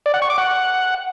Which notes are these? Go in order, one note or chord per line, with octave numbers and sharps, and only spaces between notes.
D5
F#5
C#6
D6
F#5